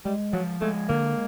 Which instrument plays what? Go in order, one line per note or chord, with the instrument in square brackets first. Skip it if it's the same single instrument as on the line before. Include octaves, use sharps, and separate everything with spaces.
[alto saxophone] G3 [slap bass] G#3
[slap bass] F3 [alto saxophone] F#3
[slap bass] G#3 [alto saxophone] A3
[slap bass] D3 [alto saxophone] A#3